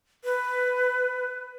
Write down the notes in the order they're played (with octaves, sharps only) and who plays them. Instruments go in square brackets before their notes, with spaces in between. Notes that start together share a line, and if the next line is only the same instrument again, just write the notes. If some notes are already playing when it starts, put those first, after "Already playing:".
[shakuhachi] B4